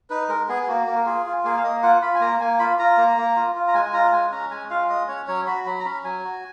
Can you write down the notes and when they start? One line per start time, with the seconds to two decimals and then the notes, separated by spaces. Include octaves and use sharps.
0.10 D#4 B4
0.29 G#3 A#4
0.49 B3 G#4
0.63 G#4
0.68 A#3 F#4
0.87 A#3
0.96 A#4
1.06 F4 G#4
1.26 F4
1.45 A#3 G#4
1.57 F5
1.63 A#3 D#5
1.83 F4 F#5
2.02 F4 B5
2.15 G#5
2.21 A#3 A#5
2.40 A#3 G#5
2.59 F4 B5
2.79 F4 A#5
2.98 A#3
3.17 A#3
3.36 F4
3.55 F4
3.68 A#5
3.74 G#3 G#5
3.85 G#5
3.93 F4 A#5
4.13 G#3 G#5
4.32 C#4 A#5
4.51 G#3 G#5
4.70 F4 F5
4.89 G#3 D#5
5.08 C#4 C#5
5.28 F#3 C#5
5.47 F#4 B5
5.66 F#3 B5
5.79 A#5
5.85 C#4 B5
6.04 F#3 G#5
6.24 F#4